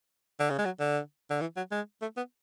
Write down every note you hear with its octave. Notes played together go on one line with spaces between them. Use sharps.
D3
C#3
G#3
F#3
D3
D3
E3
F#3
G#3
A3
B3